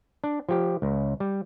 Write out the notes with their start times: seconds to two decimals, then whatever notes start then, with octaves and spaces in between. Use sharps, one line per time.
0.24 D4
0.49 F3 G4
0.82 C#2
1.20 G3